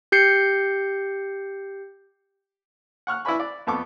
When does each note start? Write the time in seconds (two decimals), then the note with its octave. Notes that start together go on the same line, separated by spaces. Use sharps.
0.12 G4 G6 C7 C#7
3.07 F#5 C#6 F6 F#6
3.25 E4 B4 D5 G#5 B5 C#6
3.40 D5
3.67 F2 B3 A4 C#6 D6